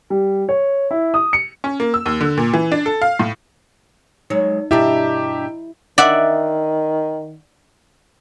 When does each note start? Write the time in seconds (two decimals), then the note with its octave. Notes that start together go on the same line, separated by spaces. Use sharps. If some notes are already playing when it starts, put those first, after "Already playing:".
0.10 G3
0.49 C#5
0.91 E4
1.14 D#6
1.33 C#7
1.64 C#4
1.80 A#3
1.94 E6
2.06 D#2
2.21 D3
2.37 A#2
2.54 E3
2.72 D4
2.86 A4
3.02 F5
3.19 A2
4.30 F#3 G#3 D#4 C#5
4.71 G2 B2 D4 E4 G4 D#5 E5 A#5
5.98 D#3 D5 E5 F#5